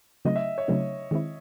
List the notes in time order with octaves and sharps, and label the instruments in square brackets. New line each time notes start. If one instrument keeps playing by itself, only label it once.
[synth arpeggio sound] C#3 F#3 A3 C4 D#4 [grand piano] D#5
[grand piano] E5
C#5
[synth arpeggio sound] C#3 F#3 A3 C4 D#4
D#3 G#3 C4 E4